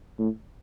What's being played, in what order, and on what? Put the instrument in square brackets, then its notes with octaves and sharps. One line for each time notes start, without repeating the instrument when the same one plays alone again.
[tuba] A2